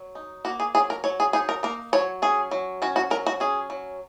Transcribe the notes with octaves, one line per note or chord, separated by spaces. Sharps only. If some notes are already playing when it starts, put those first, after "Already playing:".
Already playing: F#3
D#4
A#3 F#4
G#4
F#3 G#4
A#4
F#3 C#5
G#4
D#4 G#4
A#4
A#3 A#4
F#3 C#5
C#4 G#4
F#3
C#4 F#4
F#4
F#3 A#4
F#4
C#4 G#4
F#3